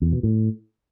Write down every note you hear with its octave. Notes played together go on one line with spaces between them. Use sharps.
E2
B2
A2